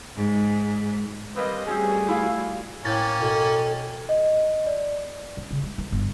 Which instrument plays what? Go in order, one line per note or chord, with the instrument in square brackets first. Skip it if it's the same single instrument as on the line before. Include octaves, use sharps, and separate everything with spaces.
[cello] G#2
[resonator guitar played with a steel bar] G3 A#3 C4 [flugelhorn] B4 [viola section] D#5
[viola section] G3 A3 F#4 [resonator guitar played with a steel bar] C4 C#4 [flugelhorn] G#4
[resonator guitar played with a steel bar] E4 F4 F5
[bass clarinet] A2 [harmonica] A#3 C#4 [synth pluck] G5 G#6 A6
[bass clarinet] B2 [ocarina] A4
[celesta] D#5
D5
[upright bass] F#2
C#3
G#3
E3
G1